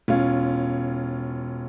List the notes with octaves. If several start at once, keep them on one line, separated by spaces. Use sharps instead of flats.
E1 C#4 F4